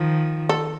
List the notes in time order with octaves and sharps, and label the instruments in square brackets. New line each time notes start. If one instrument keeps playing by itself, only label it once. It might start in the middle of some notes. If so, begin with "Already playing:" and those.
Already playing: [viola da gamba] D#3 F3
[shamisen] A4